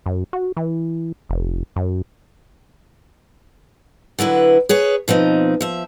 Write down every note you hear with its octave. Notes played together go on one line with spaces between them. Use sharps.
F#2
F#4
E3
F1
F#2
D3 F#3 E4 B4
G#4 B4 C#5
B2 F3 C4 D#4
F3 E5